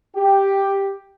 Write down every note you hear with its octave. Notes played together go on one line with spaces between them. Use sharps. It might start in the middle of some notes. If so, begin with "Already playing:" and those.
G4